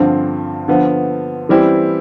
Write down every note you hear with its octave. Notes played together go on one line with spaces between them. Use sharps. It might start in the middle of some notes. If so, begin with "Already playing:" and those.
Already playing: G2 D3 F3 C4
D3 F3 B3
E3 G3 C4 E4 G4